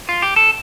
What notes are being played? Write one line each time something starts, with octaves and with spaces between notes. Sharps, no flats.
F4
G4
A4